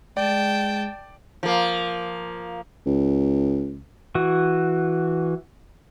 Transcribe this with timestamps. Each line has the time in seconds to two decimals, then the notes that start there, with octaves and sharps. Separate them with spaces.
0.17 G#3 D5 G5 A5
1.43 F3 A#3
2.86 C#2
4.15 E3 F#4